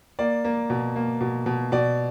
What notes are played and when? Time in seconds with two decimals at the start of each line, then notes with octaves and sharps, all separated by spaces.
0.19 A#3 D5
0.44 A#3
0.70 B2
0.96 A#3
1.21 B2
1.46 B2
1.72 B2 D5